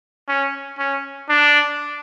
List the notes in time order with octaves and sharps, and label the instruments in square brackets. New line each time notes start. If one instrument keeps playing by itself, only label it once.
[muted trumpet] C#4
C#4
D4